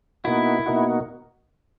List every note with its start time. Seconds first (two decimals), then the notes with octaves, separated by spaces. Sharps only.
0.24 B2 A#3 D#4 E4 F#4
0.66 B2 A#3 D#4 F#4